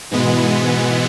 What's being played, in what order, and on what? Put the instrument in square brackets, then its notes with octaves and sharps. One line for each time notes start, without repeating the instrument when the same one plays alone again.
[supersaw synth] G#2 E3 G#3 B3 [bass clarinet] B2